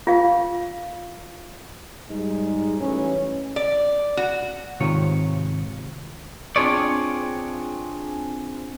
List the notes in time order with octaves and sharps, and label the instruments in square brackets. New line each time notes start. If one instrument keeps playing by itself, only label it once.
[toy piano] F4 F5
[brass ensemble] G#2 G3 G#3 D#4
A1 E3 C#4
[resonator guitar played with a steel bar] D5
F#4
[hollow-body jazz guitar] G#2 C3 D#3 F4 C#5
[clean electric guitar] C4 D4 F4 G#4 C#5 D5